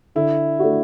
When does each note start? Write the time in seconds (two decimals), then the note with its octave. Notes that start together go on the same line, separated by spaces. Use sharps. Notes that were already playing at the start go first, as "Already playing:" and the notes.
0.15 D3 E4
0.59 A3 D4 F#4